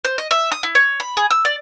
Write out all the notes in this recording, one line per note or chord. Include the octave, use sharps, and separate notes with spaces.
C5
D#5
E5
D#6
E4
C#5
B5
G#4
E6
D5